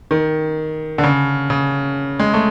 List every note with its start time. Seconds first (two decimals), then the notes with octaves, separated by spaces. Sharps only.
0.11 D#3
0.98 D3
1.03 C#3
1.50 C#3
2.19 G#3
2.34 A3